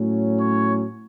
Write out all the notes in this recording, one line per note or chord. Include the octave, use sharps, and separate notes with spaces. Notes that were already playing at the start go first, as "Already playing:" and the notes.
Already playing: A2 F#3 C#4
C#5